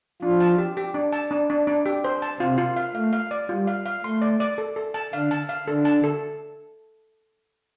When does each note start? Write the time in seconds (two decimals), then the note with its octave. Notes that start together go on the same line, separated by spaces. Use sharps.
0.22 F3 D4 F4
0.40 A5
0.58 G4
0.77 G4
0.95 D4
1.13 A5
1.31 D4
1.50 D4
1.67 D4
1.86 G4
2.04 C5
2.22 A5
2.40 C3 C4 F4
2.58 F4
2.76 F5
2.94 A3 F5
3.13 F5
3.31 D5
3.49 G3 F4
3.67 F5
3.86 F5
4.04 A3 C6
4.22 D5
4.40 D5
4.58 A4
4.76 A4
4.94 A5
5.13 D3 D4 F5
5.31 A5
5.49 F5
5.67 D3 D4 A4
5.85 A5
6.04 A4